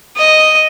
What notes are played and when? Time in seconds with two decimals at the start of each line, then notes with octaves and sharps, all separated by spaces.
0.17 D#5